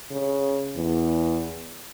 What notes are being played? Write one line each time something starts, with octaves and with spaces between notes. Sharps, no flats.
C#3
E2